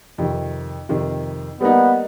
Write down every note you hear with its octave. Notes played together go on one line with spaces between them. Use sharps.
F2 C3 D#3
F2 C3 D#3
G3 A#3 B3 D#4